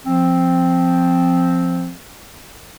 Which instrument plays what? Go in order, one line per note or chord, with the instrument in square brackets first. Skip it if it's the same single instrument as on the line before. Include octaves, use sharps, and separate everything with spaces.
[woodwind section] F3 C4